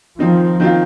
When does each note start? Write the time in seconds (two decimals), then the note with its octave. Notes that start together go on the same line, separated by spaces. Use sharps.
0.19 D#3 F3 C4 D#4
0.60 D#3 C4 F4